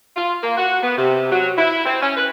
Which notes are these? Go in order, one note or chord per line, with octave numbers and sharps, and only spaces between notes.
F4
A#3
F#4
B3
C3
F#3
E4
C4
C#4
B4